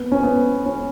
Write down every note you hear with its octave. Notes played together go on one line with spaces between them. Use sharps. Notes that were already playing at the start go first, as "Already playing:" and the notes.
Already playing: B3
C#4
B3
C#4